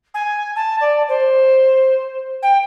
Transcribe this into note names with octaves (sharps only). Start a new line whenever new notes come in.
G#5
A5
D5
C5
G5